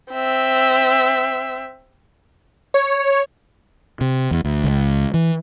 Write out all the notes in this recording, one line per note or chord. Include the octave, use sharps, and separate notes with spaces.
C4 E5
C#5
C3
E2
D2
C#2
E3